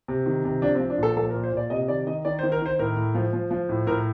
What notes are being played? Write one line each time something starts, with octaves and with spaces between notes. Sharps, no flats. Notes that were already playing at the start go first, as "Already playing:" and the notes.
C3
D#3
C3
F3 D4
C4
F3
D4
A#2 A4
F3 A4
A#4
A#2
C5
A#2 D5
C3 D#5
D#3 D5
D#3 D#5
D#3 D5
C5
D#3
A#4
D#3 C5
A2 A#4
A2
F3
F3
F3
A2
A2 A#4